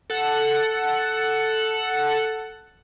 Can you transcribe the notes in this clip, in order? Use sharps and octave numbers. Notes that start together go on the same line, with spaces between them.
A4 F#5